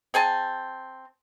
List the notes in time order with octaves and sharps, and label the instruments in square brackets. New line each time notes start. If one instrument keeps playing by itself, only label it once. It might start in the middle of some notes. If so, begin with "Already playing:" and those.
[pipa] C4 G#4 G#5 A5